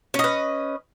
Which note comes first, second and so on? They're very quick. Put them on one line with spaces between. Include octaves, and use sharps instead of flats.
C#4 D#5 B4